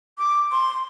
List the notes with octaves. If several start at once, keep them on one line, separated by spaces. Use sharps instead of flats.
D6
C6